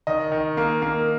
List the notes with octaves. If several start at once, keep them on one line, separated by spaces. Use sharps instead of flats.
D#3 D#5
D#3
A#3
A#3